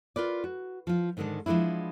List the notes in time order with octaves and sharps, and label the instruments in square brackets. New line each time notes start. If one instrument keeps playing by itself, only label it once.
[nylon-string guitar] F4 A#4 B4 D5
F#4
F3 F4
G#2 D3 D#3 G#3 D4
F3 G#3 B3 D4 E4